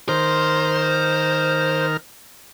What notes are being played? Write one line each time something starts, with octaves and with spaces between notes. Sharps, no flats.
D#3 A#4 C5 F6